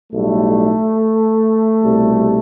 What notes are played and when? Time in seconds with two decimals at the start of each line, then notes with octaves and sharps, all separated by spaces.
0.13 B1 A2 G3 A3
1.82 C2 B2 G3